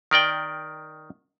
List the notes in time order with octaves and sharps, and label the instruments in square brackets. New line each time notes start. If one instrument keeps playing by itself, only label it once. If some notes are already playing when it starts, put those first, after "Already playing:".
[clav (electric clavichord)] D#3 A#4 D5 G5